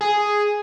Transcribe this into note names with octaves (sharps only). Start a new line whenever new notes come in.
G#4